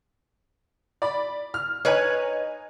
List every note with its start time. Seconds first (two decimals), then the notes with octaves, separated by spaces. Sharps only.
1.02 D5 B5
1.54 F6
1.85 D#4 B4 C#5 G#5